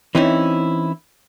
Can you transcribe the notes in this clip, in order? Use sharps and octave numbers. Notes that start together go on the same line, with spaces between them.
E3 C4 C#4 D#4 E4